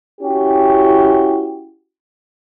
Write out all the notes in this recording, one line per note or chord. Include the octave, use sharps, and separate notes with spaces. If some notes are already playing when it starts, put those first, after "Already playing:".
C#4 E4 F#4 G4